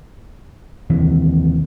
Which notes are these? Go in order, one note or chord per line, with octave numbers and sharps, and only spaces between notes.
D#2 C3 E3